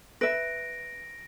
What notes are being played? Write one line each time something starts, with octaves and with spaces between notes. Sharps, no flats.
B4 E5 A#6 D7